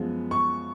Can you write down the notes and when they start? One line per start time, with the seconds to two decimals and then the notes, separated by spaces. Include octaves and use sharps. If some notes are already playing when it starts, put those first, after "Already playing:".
Already playing: F#2 F3 G#3 B3
0.31 C#6